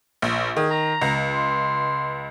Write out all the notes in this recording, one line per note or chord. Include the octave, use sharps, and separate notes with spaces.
A#1
D#3 G#4
A#5
C#2
C6